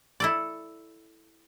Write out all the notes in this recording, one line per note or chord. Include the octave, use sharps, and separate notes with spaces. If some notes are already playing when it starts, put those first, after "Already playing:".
E4 A4 D5